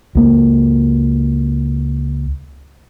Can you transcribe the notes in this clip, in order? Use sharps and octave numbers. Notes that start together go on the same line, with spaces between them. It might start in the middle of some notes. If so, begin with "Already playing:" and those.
C#2 A#3